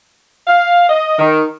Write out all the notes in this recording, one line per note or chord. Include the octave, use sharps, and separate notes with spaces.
F5
D#5
D#3